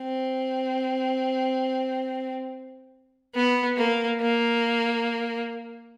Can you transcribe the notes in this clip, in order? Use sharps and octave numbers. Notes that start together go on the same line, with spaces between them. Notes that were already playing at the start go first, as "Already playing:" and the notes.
Already playing: C4
B3
A#3
A#3